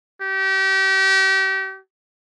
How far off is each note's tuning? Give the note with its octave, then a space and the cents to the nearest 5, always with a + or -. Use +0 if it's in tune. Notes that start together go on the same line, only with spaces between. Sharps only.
G4 -35